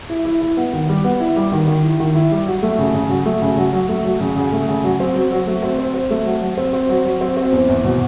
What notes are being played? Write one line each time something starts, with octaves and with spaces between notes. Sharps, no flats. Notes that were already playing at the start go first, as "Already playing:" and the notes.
E4
E4
E4
B3
D#3
G3
B3
E4
G3
D#3
D#3
E4
D#3
E4
G3
F#3
A3
C#3
C#3
F#3
A3
C#3
F#3
F#3
A3
F#3
C#3
C#3
A3
C#3
F#3
C4
F#3
F#3
A3
C4
C4
C4
A3
F#3
F#3
C4
C4
F#3
F#3
C4
C4
E2
E2
B2